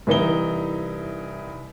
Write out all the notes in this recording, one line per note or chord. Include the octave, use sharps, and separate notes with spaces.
C2 E3 D#4 G7